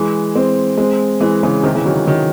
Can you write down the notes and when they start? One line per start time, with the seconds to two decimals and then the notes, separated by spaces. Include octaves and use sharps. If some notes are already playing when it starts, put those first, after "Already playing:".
Already playing: E3 G#3
0.35 G#3 C4
0.78 G#3 C4
1.20 E3 G#3
1.43 C#3 E3
1.63 C3 D#3
1.75 C#3 E3
1.85 D#3 F#3
2.07 D#3 F#3